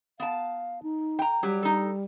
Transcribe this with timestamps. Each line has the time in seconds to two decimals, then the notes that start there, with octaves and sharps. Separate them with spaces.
0.20 B3 F5 A5
0.83 D#4
1.19 G5 A#5
1.43 F#3 G3 G4
1.63 D#4 A4